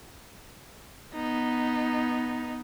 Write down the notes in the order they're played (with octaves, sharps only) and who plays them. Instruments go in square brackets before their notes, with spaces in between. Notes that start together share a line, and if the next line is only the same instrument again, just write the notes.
[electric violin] B3 D#4